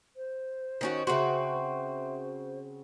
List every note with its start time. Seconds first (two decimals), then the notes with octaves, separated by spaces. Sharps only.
0.16 C5
0.81 D#3 C#4 F#4
1.07 C#3 C4 F#4 E5 C6